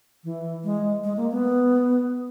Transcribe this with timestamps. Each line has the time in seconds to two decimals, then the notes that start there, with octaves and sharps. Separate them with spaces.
0.24 E3
0.64 G#3
1.04 G#3
1.17 A#3
1.31 B3